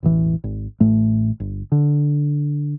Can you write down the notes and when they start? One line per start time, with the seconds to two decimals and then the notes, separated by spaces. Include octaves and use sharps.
0.03 E1 A1 E3
0.44 G#1
0.80 A1 A2 A3
1.40 G1
1.72 D3